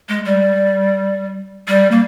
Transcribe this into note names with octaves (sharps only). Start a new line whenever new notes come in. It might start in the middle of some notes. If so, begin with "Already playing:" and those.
G#3
G3
G3
A#3